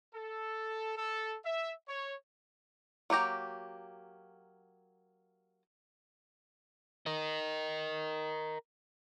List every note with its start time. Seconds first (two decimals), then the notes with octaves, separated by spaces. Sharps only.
0.14 A4
0.96 A4
1.45 E5
1.87 C#5
3.10 F#3 A#3 G4 A#5
7.06 A#4 D#5